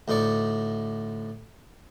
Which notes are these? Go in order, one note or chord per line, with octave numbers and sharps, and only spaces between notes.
D2 A2 D#4 D5 C#6